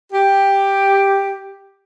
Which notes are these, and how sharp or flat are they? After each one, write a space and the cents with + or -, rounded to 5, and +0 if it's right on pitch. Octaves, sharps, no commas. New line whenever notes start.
G4 +5